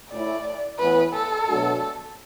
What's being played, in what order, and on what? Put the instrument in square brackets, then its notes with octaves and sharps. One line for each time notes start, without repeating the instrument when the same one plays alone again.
[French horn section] A2 A3 E4 [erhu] D5
[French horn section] A2 E3 B3 [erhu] B4
[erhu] A4
[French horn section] B2 F#3 A3 D4 F#4